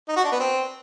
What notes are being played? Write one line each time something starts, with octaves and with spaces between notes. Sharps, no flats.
D#4
F#4
D4
B3
C4